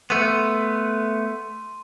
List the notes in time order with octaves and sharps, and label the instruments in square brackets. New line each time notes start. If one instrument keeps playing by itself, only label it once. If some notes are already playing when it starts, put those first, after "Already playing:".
[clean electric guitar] A3 B3 [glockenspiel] C6 D#7